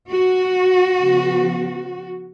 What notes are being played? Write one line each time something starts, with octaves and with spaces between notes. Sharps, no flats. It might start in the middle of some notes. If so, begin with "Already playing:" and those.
F#4
C#3 F3 B3